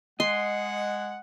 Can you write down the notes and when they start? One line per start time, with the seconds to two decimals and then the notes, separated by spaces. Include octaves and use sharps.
0.20 G#3 D#5 F#5 C6